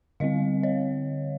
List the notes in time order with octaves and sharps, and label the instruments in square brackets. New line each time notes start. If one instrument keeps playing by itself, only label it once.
[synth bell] D3 G3 C4 D#5 F5
C#5 D#5